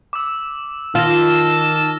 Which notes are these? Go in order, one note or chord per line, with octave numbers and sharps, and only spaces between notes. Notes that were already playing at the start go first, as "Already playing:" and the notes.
D6 E6
D#3 F4 A5 E6 F6 A#6